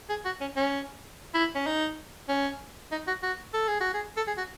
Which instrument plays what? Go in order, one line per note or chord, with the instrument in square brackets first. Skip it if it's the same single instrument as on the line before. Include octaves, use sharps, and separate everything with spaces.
[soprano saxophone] G#4
F#4
C#4
C#4
E4
C#4
D#4
C#4
D#4
F#4
F#4
A4
G#4
F#4
G#4
A4
G#4
F#4